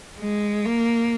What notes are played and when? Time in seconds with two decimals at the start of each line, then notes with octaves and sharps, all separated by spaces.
0.19 G#3
0.65 A#3